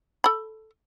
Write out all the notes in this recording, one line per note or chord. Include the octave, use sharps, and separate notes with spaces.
A4 B5